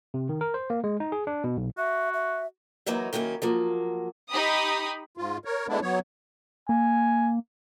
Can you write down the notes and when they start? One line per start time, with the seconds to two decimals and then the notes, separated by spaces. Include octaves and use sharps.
0.14 C3
0.29 D#3
0.41 A#4
0.54 C5
0.70 A#3
0.84 G#3
1.00 D#4
1.12 G#4
1.27 D4
1.44 B2
1.57 B1
1.78 F#4 E5
2.14 E5
2.86 E3 F#3 A#3 D#4 F#4
3.13 D#3 F#3 A#3 C#4 E4
3.42 F3 F#3 A#3
4.31 D#4 G4 B5 D#6
5.17 G#2 F4
5.45 A#4 C#5
5.68 G#3 A3 B3 D4 E4
5.82 F#3 B3 C#5
6.69 A#3 G#5